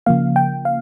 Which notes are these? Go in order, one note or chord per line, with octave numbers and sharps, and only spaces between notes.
C#3 F3 A#3 F5
G5
F5